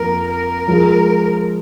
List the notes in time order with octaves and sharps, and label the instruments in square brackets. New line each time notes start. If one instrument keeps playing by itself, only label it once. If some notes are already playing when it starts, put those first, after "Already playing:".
Already playing: [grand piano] F2 F3 A#3 [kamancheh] A#4
[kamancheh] A#4
[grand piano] F3 G#3 F4